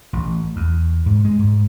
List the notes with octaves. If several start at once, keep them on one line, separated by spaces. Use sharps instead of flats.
A1
E2
G#2
G#3
G#2